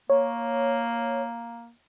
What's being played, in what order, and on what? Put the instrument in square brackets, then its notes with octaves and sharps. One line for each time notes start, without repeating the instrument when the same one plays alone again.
[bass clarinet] A#3 [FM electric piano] C#5